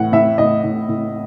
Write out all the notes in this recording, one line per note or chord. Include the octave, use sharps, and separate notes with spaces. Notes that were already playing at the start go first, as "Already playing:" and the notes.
Already playing: A2 E3 F#5
A2 E5
A2 D#5
A2
A2